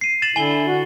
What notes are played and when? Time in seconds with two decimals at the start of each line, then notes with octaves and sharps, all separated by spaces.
0.01 C7 D#7
0.22 A6 E7 F#7
0.36 D3 E4 G#5 G7
0.67 F#4